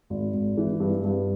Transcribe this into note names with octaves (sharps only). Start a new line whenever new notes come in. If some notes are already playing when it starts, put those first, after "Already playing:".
G#1
G#1
E3
G2
G2